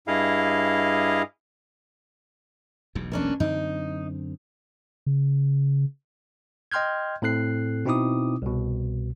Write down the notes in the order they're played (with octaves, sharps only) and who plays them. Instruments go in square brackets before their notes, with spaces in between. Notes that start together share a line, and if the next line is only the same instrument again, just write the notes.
[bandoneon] G2 E4 G#4 D#5 F5
[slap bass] E1 B1 E2
[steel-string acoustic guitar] A#3 C#4 D4
[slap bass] F#2 D3 C4 [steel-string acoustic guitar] D#4
[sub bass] C#3
[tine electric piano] D#5 G5 C6 F6 G6 G#6
A2 C4 A4 F#6 C7
B2 C4 D#4 E4 D6 D#6
C2 B2